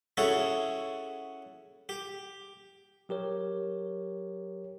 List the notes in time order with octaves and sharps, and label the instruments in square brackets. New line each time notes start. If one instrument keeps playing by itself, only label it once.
[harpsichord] C#4 E4 F#4 G#4 A4
G4
[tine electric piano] F#3 G4 A#4 C#5